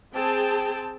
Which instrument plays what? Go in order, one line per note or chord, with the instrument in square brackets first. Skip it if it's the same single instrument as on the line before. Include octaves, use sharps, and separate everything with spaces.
[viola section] C4 G#4 G5 A5